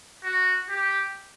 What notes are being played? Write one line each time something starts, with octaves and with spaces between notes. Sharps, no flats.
F#4
G4